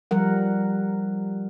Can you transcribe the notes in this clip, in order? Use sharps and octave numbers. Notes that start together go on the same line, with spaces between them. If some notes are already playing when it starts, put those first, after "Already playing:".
F3 G3 A#4 F#5